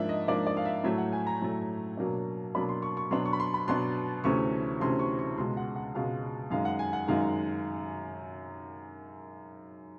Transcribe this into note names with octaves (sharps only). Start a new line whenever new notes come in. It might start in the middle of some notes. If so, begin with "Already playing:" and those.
Already playing: G#2 F3 A#3 D4 E5
D#5
G#2 F3 A#3 D4 D5
D5
F5
E5
A2 F#3 A3 E5
F#5
G#5
A#5
A2 F#3 A3
B2 F#3 A#3 D4
B2 F#3 A#3 D4 B5
C6
C#6
C#6
B2 F#3 B3 D4 C6
C#6
B5
C6
B5
B2 F#3 B3 D4 C6
D2 C3 E3 A3 C#4 C#6
D2 C3 E3 A3 C#4 C6
C#6
C#6
C#2 B2 G#3 C6
F#5
F#5
C#2 B2 G#3 F5
F#2 D#3 G#3 F5
F#5
G#5
F#5
F#2 D#3 G#3 F5